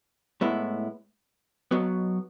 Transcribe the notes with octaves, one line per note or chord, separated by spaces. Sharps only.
A2 G#3 B3 E4
B1 B2 F#3 B3